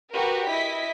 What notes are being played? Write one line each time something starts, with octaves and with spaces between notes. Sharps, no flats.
F#4 G4 A#4 B4
E4 D#5 B6